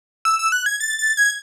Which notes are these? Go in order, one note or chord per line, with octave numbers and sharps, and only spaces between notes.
E6
E6
F#6
G#6
A6
A6
G#6